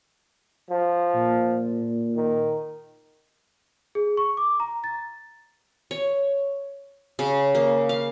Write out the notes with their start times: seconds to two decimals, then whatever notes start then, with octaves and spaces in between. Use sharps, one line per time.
0.70 F3
1.15 A#2
2.15 D#3
3.95 G#4
4.17 C#6
4.37 D6
4.60 A#5
4.84 A6
5.91 C#5
7.19 C#3
7.55 A#3
7.89 F5